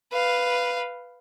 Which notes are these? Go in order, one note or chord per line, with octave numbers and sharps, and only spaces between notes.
B4 F5